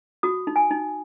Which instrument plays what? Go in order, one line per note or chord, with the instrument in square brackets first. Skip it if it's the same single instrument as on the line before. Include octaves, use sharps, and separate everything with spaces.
[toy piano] F#4 D#6
D#4
G#5
D#4